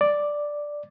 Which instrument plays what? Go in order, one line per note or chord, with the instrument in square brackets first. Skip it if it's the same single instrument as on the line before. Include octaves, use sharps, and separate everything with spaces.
[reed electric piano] D5